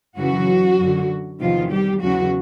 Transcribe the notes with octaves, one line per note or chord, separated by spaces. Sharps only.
F#2 C#3 E3 F#3 F#4
F#2 D3
E2 C3 D#3 F3 F4
G3 G4
E2 C#3 E3 F#3 F#4